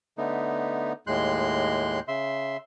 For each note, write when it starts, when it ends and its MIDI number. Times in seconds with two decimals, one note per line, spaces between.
0.18 0.93 50
0.18 0.93 57
0.18 0.93 59
0.18 0.93 63
1.07 2.00 39
1.07 2.00 45
1.07 2.00 56
1.07 2.00 84
1.07 2.00 90
1.07 2.00 91
2.08 2.57 49
2.08 2.57 76
2.08 2.57 84